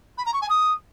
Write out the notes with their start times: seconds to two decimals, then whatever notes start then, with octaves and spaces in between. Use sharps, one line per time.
0.18 B5
0.26 A#5
0.34 C#6
0.42 G#5
0.50 D#6